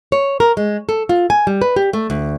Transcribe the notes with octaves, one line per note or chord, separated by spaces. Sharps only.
C#5
A#4
G#3
A4
F4
G#5
G3
B4
G4
A3
D2